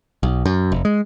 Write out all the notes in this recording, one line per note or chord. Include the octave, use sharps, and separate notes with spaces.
B1
F#2
F1
G#3